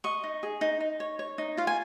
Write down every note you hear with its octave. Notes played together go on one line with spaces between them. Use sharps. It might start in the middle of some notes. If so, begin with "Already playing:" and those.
D#5 C#6
D#4
G#4
D#4
D#4
C#5
C#5
D#4
F4 F5
G#5